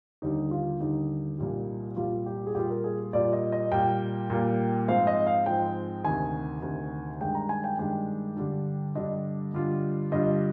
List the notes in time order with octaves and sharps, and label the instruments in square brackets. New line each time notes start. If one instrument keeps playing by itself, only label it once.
[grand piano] D#2 D3 G3 [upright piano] D#4
[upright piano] F4
[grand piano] D#2 D3 G3 [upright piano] D#4
[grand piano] C2 A#2 G3
[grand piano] C2 A#2 G3 [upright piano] F4
[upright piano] G4
G#4
[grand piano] A#2 G3 A#3 F4 [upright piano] G4
[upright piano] A#4
G#4
[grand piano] A#2 G3 A#3 F4 [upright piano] D5
[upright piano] D#5
D#5
[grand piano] A#2 G3 A#3 [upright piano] G5
[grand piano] A#2 G3 A#3
[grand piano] G#2 F3 G#3 C4 [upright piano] F5
[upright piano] D#5
F5
[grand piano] G#2 F3 G#3 C4 [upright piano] G5
[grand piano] D2 C3 D#3 [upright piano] G#5
[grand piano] D2 C3 D#3
[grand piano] G2 D#3 G#3 D4 [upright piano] G5
[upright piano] A#5
G#5
G5
[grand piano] G2 D#3 G#3 D4 [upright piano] G5
[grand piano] G2 D3 G3 D4
[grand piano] G2 D3 G3 D4 [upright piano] D#5
[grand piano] G2 D3 G3 D4 F4
[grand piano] G2 D3 G3 D4 F4 [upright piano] D#5